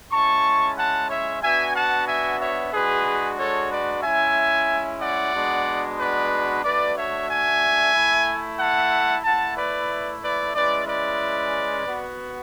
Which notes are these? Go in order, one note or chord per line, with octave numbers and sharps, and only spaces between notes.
G#3 C#4 E4 A5 C#6
F#5 A5
C#5 E5
B3 D4 F#4 E5 G#5
F#5 A5
E5 G#5
C#5 E5
G#3 D4 F#4 G#4 B4
A4 C#5
B4 D5
G#3 C#4 E4 E5 G#5
D5 F#5
G#3 B3 D4 F#4
B4 D5
A3 D4 F#4 B4 D5
C#5 E5
E5 G#5
A3 E4
F#5 A5
A3 E4 F#5 A5
B4 D5
B4 D5
G#3 C#4 E4 B4 D5
B4 D5
B3 F#4